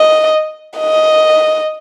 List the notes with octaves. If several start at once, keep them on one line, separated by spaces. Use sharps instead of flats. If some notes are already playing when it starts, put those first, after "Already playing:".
Already playing: D#5
D#5